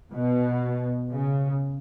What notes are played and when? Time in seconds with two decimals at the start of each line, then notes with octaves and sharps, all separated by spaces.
0.12 B2
1.12 C#3